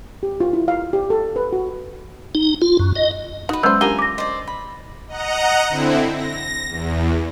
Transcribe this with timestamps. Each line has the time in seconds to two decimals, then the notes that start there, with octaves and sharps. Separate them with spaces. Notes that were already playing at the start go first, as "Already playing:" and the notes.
0.23 G4
0.40 F4
0.53 E4
0.68 F5
0.93 G4
1.10 A4
1.36 B4
1.53 F#4
2.35 D#4
2.62 F4
2.79 F#2
2.95 D#5
3.49 D#4 F#4 B4
3.63 F#3 G#3 B3 C#4 C5 E6 G6
3.81 D4 F4 G4 A#4 F#5 G#5 A#5 G7
3.99 D6 A#6
4.18 C5 D5 D#5
4.47 B5
5.08 D#5 F#5 A#5
5.69 D3 C4 E4
6.13 A#6
6.68 E2